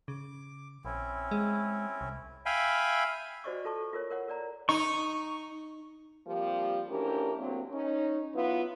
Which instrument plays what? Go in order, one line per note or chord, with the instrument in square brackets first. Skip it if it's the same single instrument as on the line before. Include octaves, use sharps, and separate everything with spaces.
[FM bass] C#3 [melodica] D6
[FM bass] A#1 [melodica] C4 C#4 E4
[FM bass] G#3
C2
[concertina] E5 F5 G5 G#5 B5
[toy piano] F#4 C5 D5 D#5 C#6 D6
F4 A4 A5 C#6
F4 A#4 C#5
A#4 C#5 F#5
A#4 D5 A#5
[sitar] D#4 [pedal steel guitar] C#6
[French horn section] F3 G3 A#3 C4 G4
D2 E3 C#4 D4 G4 A#4
D2 F#3 A#3 C4
C#4 D#4
F#3 B3 E4 F4 B4